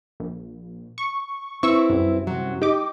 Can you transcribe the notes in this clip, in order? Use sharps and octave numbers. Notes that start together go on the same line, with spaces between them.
A#1
C#6
C4 E4 B4 C#6 E6
C2 F#2
C3 F#3
D#4 G4 D#5 D6